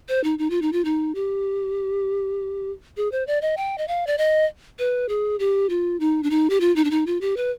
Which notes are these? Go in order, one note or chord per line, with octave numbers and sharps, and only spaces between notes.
C5
D#4
D#4
F4
D#4
F4
D#4
G4
G#4
C5
D5
D#5
G5
D#5
F5
D5
D#5
B4
G#4
G4
F4
D#4
D4
D#4
G4
F4
D#4
D4
D#4
F4
G4
B4